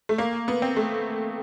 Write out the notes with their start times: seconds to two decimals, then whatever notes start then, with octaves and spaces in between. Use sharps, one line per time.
0.09 A3
0.18 A#3
0.48 B3
0.62 C4
0.77 A3